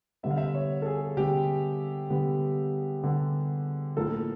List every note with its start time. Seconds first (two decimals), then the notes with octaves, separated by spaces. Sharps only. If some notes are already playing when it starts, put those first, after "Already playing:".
0.23 D3 G3 B3 E5
0.31 F5
0.38 E5
0.55 C#5
0.82 A4
0.86 G#4
1.17 D3 G3 B3 G4
2.10 D3 G3 B3
3.03 D3 G3 B3
3.97 A2 F3 A#3 A4